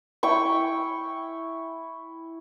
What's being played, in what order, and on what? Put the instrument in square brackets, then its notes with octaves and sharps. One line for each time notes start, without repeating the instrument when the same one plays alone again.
[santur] E4 G5 C#6